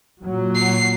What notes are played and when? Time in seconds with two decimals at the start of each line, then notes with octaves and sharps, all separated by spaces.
0.24 A#2 F#3
0.56 C7